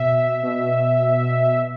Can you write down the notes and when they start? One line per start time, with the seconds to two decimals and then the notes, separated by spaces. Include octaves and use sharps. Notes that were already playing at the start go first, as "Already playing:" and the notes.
Already playing: B2 E5
0.43 B2